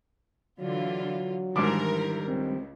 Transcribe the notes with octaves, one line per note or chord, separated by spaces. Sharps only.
D3 E3 F#3 F4
G#2 D#3 E3 G3 D4 A#4 D6
C#2 C4